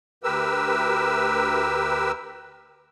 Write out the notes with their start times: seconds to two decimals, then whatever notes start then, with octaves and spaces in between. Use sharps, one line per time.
0.24 D2 G4 A#4 B4 E6